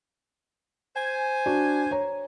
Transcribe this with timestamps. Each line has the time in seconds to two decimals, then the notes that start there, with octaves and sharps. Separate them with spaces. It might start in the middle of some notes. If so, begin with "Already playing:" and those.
0.96 C5 G#5
1.46 D4 F#4
1.91 C#5 A#5